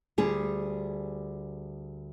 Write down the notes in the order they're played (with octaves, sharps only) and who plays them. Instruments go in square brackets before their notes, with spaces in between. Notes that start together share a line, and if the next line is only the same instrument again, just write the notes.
[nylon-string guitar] D2 G3 G#4